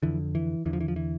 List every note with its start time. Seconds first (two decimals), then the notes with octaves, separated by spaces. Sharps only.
0.03 F2 D3 E3
0.35 E3
0.65 E2 D3 E3
0.73 F3
0.81 E3
0.88 F3
0.96 E3